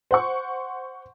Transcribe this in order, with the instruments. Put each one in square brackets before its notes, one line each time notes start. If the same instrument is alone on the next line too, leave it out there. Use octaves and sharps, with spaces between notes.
[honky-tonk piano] C5 F#5 C#6